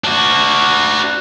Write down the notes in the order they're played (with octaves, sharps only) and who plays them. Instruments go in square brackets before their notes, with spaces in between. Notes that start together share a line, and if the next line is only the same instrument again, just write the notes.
[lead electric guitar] D4 F#4